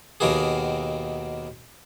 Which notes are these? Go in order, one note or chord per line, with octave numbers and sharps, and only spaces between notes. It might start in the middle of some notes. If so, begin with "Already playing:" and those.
D#2 B2 D#3 A#3 F#4 G#4